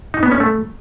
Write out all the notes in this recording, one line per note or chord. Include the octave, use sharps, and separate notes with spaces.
D#4
B3
C#4
A3